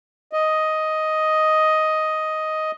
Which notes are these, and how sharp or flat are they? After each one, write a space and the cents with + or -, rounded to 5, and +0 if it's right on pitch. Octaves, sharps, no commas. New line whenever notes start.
D#5 +5